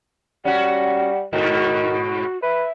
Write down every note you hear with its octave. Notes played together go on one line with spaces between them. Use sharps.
G3 C#4 F#4 F#5
G#2 B2 D#3 F#4
B4 E5